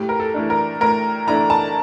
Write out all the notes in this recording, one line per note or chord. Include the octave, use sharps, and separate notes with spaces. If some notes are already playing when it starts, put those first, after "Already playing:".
Already playing: A2 G4
A#4
A4
E3 A3 D4
A#4
A2 A#4
E3 A3 D4 A#5
A5